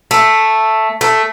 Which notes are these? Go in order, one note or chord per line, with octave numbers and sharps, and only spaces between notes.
A3
A3